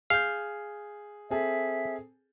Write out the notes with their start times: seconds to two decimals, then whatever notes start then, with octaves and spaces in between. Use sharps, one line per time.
0.10 G#4 F5 G6
1.31 C4 G#4 A4 E5